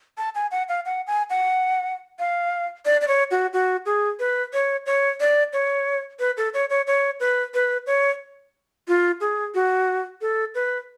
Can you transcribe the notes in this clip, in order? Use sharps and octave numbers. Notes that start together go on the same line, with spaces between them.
A5
G#5
F#5
F5
F#5
G#5
F#5
F5
D5
D5
C#5
F#4
F#4
G#4
B4
C#5
C#5
D5
C#5
B4
A4
C#5
C#5
C#5
B4
B4
C#5
F4
G#4
F#4
A4
B4